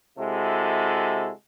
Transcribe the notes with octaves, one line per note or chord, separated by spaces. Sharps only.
C3 G#3 E4 F#4 A4